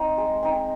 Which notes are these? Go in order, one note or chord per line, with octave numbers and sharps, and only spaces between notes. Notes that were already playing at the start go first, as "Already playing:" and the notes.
Already playing: C4 D#4
G#3
C4 D#4